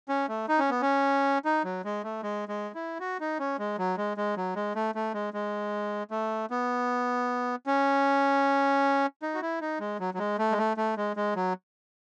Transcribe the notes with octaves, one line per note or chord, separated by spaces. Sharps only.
C#4
A3
D#4
C#4
B3
C#4
D#4
F#3
G#3
A3
G#3
G#3
E4
F#4
D#4
C#4
G#3
F#3
G#3
G#3
F#3
G#3
A3
A3
G#3
G#3
A3
B3
C#4
D#4
F#4
E4
D#4
G#3
F#3
F#3
G#3
A3
G#3
A3
A3
G#3
G#3
F#3